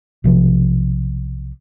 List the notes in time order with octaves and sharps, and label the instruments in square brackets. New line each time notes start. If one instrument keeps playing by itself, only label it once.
[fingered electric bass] B1 C3 F3